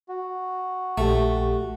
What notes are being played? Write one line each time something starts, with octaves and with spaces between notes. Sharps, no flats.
F#4
A#1 A3 G4